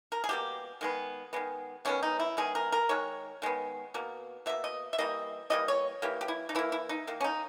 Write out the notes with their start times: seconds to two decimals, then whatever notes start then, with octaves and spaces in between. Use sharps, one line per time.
0.12 A#4
0.24 G#4
0.29 B2 G3 A#3 G4
0.81 D#3 G#3 B3
1.33 D#3 G#3 B3
1.85 D#3 G#3 B3 C#4
2.03 D#4
2.20 E4
2.37 D#3 G#3 B3 G#4
2.55 A#4
2.72 A#4
2.89 D#3 G#3 C#5
3.42 D#3 G#3 B3
3.94 B2 A#3
4.46 B2 A#3 E5
4.64 D#5
4.93 E5
4.98 E3 G3 A#3 D#5
5.50 E3 G3 A#3 D#5
5.68 C#5
6.02 E3 A#3 G4
6.21 G4
6.28 E4
6.49 D#4
6.55 E3 A#3 E4
6.72 E4
6.89 D#4
7.07 D#3 A#3
7.21 C#4
7.24 D#4